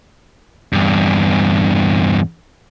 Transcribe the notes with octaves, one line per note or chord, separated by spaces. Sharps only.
E2 G2